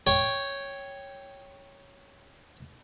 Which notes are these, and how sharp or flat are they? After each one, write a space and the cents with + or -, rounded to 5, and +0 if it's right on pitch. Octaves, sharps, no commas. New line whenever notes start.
C#5 +0 G5 +0